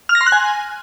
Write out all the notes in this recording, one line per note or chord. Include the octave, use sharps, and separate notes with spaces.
F6
A#6
C6
F#6
G#5